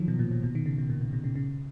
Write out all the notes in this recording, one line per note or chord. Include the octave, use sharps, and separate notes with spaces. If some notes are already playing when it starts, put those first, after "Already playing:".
Already playing: D#3 F3 F#3
B2
A#2
B2
B2
D#3
C#3
B2
A#2
B2
B2
C#3
C#3